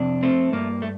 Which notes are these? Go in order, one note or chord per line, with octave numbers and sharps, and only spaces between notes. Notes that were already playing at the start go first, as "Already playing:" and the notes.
Already playing: F2 C3 D4
A3 C4
G2 A#3
A3